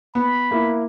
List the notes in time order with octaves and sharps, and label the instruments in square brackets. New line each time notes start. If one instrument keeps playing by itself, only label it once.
[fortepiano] B3 [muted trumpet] B5
[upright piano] A#3 E4